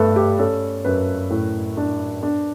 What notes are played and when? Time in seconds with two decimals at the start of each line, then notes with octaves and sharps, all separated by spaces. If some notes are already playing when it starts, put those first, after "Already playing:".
Already playing: G2 A3 A4 B4 E5
0.16 G4
0.39 C#4 A4
0.85 F#2 B4
1.30 A2
1.77 D4
2.23 D4